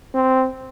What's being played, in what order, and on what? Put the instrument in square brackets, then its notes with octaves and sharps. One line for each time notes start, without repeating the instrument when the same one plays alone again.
[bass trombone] C4